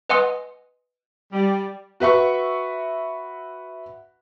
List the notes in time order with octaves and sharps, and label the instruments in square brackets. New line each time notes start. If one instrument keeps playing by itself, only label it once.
[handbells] B4 D#5 F#5 G#5 C6 D#6
[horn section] G3
[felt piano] F#4 B4 E5 C#6